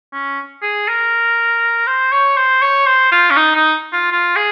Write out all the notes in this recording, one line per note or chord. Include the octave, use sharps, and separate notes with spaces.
C#4
G#4
A#4
C5
C#5
C5
C#5
C5
F4
C#4
D#4
D#4
F4
F4
G#4